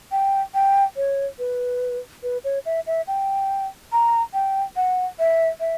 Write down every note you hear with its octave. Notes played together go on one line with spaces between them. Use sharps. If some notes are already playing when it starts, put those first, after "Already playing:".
G5
G5
C#5
B4
B4
C#5
E5
E5
G5
A#5
G5
F#5
E5
E5